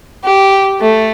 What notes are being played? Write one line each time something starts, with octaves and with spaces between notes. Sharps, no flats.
G4
A3